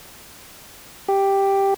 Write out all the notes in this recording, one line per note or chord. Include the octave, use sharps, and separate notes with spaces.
G4